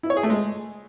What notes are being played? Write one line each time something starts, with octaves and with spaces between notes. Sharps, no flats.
E4
C#5
G#4
A3
G#3